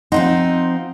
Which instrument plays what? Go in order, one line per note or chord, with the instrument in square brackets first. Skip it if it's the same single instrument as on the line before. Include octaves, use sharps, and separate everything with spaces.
[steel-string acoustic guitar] F3 C4 D#4 [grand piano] D#5 F#5 C6